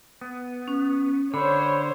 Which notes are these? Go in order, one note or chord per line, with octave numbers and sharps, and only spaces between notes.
B3
C#4
D3 C5 C#5 B5